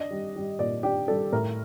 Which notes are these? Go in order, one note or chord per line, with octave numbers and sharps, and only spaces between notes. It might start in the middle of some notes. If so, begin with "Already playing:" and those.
Already playing: D4 D#5
G3
G3
A#2 D5
D4 G4
G3 A4
A2 A#4